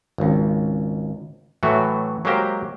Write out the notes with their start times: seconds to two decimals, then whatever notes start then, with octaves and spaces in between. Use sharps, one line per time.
0.18 G#1 C#2
1.63 A2 E3 F#3 A3 F#4
2.25 F#3 G#3 A#3 G4 C5